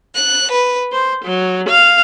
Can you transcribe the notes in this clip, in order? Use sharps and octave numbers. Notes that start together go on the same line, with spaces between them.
F#6
B4
C5
F#3
F5